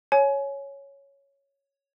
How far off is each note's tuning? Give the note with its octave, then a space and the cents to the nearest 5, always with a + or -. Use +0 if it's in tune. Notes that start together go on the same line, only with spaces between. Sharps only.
C#5 +0 G#5 +25